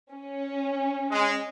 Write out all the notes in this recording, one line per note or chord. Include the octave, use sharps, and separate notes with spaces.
C#4
G#3